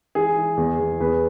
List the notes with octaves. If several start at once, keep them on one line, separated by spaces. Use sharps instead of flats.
E3 G#4
E3
E2
E2
E2 B4